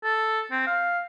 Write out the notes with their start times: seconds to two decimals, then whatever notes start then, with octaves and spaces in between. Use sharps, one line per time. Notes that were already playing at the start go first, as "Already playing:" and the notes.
0.03 A4
0.51 C4
0.67 F5